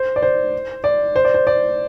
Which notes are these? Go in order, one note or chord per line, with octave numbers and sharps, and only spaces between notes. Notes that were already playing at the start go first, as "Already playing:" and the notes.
Already playing: C5
D5
C5
D5
C5
D5
C5
D5